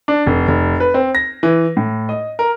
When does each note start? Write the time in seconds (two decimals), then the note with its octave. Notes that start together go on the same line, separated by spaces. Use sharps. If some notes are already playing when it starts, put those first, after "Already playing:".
0.08 D4
0.26 F1
0.48 F1
0.80 B4
0.94 C4
1.15 A#6
1.43 E3
1.77 A2
2.09 D#5
2.39 A#4